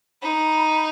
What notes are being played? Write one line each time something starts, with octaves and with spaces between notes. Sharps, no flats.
D#4 B5
B5